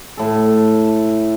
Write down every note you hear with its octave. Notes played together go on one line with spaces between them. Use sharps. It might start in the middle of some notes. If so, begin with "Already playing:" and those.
A2 A4